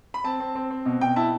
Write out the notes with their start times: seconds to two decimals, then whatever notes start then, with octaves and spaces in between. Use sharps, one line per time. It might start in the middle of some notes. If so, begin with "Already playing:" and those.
0.14 B5
0.24 C4 A5
0.40 C4
0.55 C4
0.70 C4
0.86 B2
1.01 B2 G5
1.16 E4 A5